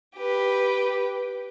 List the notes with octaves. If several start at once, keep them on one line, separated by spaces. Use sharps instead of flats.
G4 B4